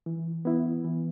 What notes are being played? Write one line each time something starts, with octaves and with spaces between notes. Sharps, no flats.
E3
B3 E4
E3